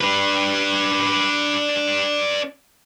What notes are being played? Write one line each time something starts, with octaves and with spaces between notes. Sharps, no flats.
D4 B4